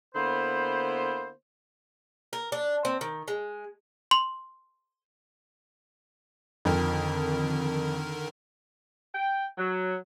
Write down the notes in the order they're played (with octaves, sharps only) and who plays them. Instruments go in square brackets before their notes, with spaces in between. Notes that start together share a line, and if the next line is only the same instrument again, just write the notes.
[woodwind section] D3 A#3 B3 E4 C5
[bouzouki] A#4
D4
C4
D#3
G#3
[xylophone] C6 F#7
[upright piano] F2 [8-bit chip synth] D3 D#3 A#4
[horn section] G5
F#3